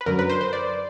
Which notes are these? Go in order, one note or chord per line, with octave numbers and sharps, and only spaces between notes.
B4
F#2 D3 F#3 A#4
B4
C5
C5
D5